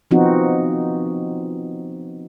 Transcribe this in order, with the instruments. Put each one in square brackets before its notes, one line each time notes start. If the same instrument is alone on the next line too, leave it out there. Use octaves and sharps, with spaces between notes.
[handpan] F3 B3 C4 D#4 F#4